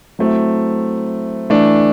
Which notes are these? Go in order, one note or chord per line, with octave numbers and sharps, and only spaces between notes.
F#3 A3 C4 E4
E3 A3 D4